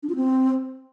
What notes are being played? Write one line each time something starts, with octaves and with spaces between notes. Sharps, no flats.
D4
F4
C4